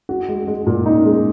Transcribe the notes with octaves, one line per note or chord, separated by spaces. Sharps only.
F#4
G#3
G#3
A#2
D#4
G#3